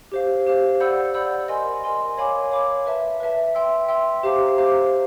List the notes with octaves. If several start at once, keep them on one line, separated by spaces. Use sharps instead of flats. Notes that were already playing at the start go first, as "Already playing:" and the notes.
G4 C5 F5
G4 C5 F5
D5 F#5 B5 E6 G6
D5 F#5 B5 E6 G6
A#4 D#5 G#5 C6
A#4 D#5 G#5 C6
C#5 F5 G#5 B5 D6
C#5 F5 G#5 B5 D6
B4 E5 A5
B4 E5 A5
E5 G5 C6 E6
E5 G5 C6 E6
G4 C5 F5 A#5 D6
G4 C5 F5 A#5 D6